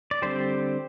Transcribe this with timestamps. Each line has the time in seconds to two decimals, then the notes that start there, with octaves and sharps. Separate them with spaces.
0.11 D5
0.22 D3 G3 C4 G4 C5